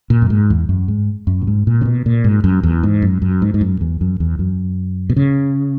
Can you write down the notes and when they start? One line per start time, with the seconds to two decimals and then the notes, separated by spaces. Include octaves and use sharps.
0.10 A#2
0.22 F#2
0.30 G#2
0.50 E2
0.69 F#2
0.88 G#2
1.27 F#2
1.42 A#2
1.47 G#2
1.67 A#2
1.81 C#3
1.85 B2
2.06 A#2
2.24 G#2
2.44 F#2
2.63 E2
2.83 G#2
3.02 F#2
3.22 F#2
3.42 G#2
3.54 G#2
3.61 F#2
3.81 E2
4.01 F#2
4.20 E2
4.39 F#2
5.10 B2
5.16 C#3